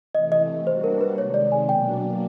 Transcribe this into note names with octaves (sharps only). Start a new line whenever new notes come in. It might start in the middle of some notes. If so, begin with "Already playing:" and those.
C3 E3 A3 D#5
D#5
G3 A#3 D4 F#4 C5
A#4
B4
C3 D#3 G#3 C#5
D5
G#5
B2 F#3 A#3 D4 G5